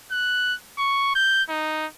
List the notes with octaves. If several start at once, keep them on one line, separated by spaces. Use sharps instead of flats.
F#6
C#6
G6
D#4